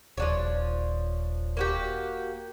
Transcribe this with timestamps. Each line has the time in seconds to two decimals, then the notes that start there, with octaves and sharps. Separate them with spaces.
0.17 D#1 F3 D4 C#5
1.57 A#3 F#4 G4